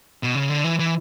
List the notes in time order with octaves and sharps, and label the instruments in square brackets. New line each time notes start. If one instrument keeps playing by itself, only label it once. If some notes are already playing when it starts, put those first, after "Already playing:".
[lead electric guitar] B2
C#3
D3
E3
E3